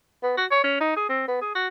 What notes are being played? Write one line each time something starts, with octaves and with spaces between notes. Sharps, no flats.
B3
F#4
C#5
C#4
D#4
G#4
C4
B3
G#4
F#4